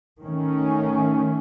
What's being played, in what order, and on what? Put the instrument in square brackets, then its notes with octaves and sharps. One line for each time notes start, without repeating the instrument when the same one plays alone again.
[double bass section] D#3 A3 C#4